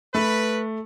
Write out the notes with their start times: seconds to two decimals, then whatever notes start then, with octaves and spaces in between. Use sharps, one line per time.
0.15 A3 B4